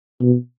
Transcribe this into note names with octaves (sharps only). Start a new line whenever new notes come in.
B2